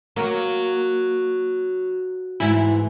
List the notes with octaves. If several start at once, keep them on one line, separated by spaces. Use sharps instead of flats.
F#3 A#3
G#2 E3 E4